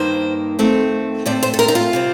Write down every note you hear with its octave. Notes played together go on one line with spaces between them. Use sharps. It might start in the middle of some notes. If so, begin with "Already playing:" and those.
Already playing: G2 D#3 A#3 C5
F2 D#3 A3 C4
A2 A3 C4 D5
C5
A4
A#4
D#4
F4
C3 G3 C4